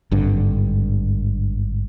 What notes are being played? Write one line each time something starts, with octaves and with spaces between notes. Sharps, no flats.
G#1 G2 D3